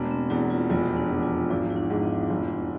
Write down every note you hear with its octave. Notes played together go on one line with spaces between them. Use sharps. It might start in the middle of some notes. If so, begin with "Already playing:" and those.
Already playing: E1 B2 A3 D4
C4
E2 E4
F4
F1 F4
D4
E2
F4
G#1 E4
E4
D4
G#2
B3
F1